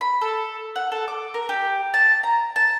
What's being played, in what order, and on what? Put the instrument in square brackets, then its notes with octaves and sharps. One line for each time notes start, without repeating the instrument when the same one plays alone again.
[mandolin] B5
A4
F#5
A4
D6
A#4
G4
A5
A#5
A5